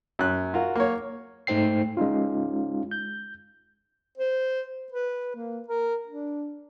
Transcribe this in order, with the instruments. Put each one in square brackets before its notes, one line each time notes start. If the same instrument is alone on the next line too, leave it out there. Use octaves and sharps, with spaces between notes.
[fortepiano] F#2 F#6
F4 F#4 A#4
A#3 C#5
[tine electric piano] G#2 A3 D#4 C5 G5 C7
G#3 C#4 D#4 F4
G6
[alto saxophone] C5
B4
A#3
A#4
D4